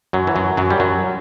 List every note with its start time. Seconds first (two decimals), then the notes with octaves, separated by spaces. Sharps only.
0.13 F#2 F#3
0.27 E3
0.36 F#2 F#3
0.57 F#2 F#3
0.70 G3
0.80 F#2 F#3